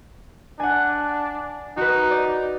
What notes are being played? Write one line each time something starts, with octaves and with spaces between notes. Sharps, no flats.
D4 F#5 G#5
D#4 F#4 B4
D5